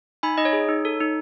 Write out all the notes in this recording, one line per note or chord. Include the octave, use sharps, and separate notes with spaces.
D#4 G#5 B5
D#4 D#5
C#5
G#4
D#4
A4
D#4